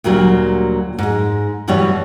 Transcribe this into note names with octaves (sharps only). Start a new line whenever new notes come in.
D2 A#2 F#3 G3
G#2 G#3
G2 B2 E3 G3 B3 C#5